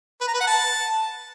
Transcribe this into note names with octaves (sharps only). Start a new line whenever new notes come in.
B4
A#5
B4
F#5
A5